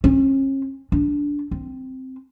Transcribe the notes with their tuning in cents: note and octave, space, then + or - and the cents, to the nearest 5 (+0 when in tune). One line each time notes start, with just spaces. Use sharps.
C#4 -45
D4 -15
C4 -5